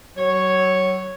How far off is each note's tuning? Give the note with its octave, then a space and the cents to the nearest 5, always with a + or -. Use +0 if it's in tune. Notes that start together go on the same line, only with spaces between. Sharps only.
F#3 +30 C#5 -5